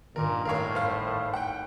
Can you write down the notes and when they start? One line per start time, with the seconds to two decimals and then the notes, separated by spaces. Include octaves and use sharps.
0.16 G2 A#2 D#3 A#4
0.45 A2 A#4 C#5 F5 F#5 C7
0.75 G#1 C5 F5 B6
1.34 F#5 G5